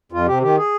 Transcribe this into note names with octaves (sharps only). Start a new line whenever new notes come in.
F2 F4
C3 G4
D#3 G4
G#4